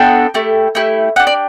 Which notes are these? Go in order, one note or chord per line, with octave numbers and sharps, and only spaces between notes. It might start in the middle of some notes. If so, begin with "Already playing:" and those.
Already playing: B3 D4 F#4 A4 G5
A3 E4 G4
A3 E4 G4
D4 G4 F#5
D5